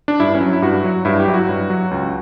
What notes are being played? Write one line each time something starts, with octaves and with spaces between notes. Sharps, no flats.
D4
G2 E4
C#4
F#3
E4
G2 F#4
F#3
G2 E4
G4
F#3 E4
F#4
G2
F#3
C#2